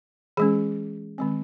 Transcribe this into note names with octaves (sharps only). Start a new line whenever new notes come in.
E3 G#3 C#4 G#4
D#3 G#3 C4